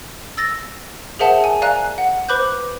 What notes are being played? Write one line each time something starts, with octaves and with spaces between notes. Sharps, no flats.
E6 A6 A#6
G#4 A#4 C5 E5 F#5 A5
G#5
D5 F5 G#5 A#5 F#6
F#5
B4 C5 B5 D6 F#6 G6